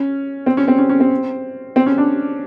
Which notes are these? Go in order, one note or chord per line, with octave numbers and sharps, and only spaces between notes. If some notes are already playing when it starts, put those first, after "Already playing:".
Already playing: C#4
C4
C#4
C4
C#4
C#4
C4
C4
C#4
D4